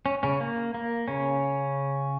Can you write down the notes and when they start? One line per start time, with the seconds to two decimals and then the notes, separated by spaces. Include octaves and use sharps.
0.06 C#4
0.23 C#3 C#4
0.41 A#3
0.74 A#3
1.08 C#3 C#4